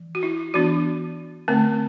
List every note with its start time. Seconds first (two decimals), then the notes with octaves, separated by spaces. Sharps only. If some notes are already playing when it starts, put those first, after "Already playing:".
Already playing: E3
0.15 F#4
0.23 E4
0.54 E3 B3 D4 F#4
1.48 D3 A3 C4